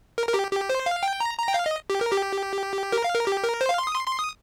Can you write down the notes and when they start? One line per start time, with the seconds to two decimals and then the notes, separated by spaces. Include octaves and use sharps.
0.18 A#4
0.28 A#4
0.34 G4
0.51 G4
0.69 C5
0.86 F5
1.03 G5
1.20 A#5
1.38 A#5
1.48 G5
1.54 F5
1.66 D#5
1.90 G4
2.01 A#4
2.12 G4
2.92 A#4
3.04 F5
3.15 A#4
3.27 G4
3.44 A#4
3.61 C5
3.69 F5
3.78 C6
3.87 D#6
3.95 C6
4.07 C6
4.19 D#6